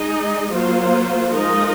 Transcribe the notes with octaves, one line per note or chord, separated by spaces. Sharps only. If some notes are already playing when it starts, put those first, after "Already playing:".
Already playing: G#3 D#4 G#4 D#5
F#3 A#3 F4 C5
F3 G#3 D#4 A#4 D#5